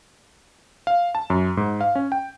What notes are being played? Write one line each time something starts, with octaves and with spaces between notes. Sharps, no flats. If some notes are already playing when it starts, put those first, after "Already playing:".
F5
A5
F#2
G#2
F5
C#4
G5